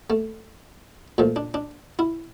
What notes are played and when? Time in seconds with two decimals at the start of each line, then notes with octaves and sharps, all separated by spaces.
0.10 A3
1.18 A#2 F3 A3
1.36 D4
1.54 D4
1.99 E4